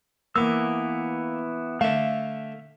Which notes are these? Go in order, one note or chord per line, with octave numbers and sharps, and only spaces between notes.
E3 A#3 B3 E6
D3 A3 E5 F5